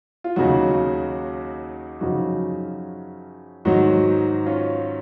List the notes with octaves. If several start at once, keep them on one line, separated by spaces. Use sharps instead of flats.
F4
D#2 C#3 F#3 D#4 F#4
F#2 C#3 F3 D#4 F#4
G#2 D#3 F#3 D#4 F#4
C#4 F4